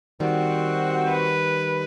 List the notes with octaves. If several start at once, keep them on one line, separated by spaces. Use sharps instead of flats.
D#3 G3 C4 F#4
B4